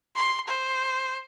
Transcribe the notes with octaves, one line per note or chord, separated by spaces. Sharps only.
C6
C5